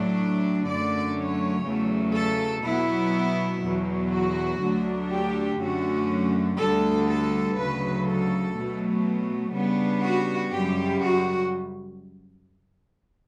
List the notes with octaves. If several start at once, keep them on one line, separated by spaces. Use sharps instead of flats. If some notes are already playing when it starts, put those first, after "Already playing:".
Already playing: A2 F#3 A3 D4
F#2 D3 A3 D5
C#5
E2 C#3 F#3 A3
A4
B2 F#3 B3 E4
E2 B2 F#3
F#4
D2 D3 F#3 A3 D4
G4
F#2 D3 A3 C#4 F#4
D2 D3 G3 A4
A4
D2 C#3 F#3 B4
A4
B2 F#3 A3
C#3 G3 B3 D4
F#4
F#2 C#3 G3 G4
F#4